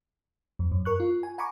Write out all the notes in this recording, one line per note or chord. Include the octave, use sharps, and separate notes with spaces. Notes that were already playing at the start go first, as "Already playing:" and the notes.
F2
F#2
A#4 C#6 F#6
F4
G#5
F#5 G#5 A#5 B5 C#6 D6